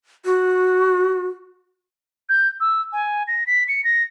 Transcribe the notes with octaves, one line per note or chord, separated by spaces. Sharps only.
F#4
G6
E6
G#5
A#6
B6
C#7
A#6